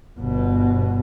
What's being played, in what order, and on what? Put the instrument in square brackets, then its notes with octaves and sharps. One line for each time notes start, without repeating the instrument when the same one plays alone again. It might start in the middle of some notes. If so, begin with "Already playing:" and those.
[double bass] G1 B2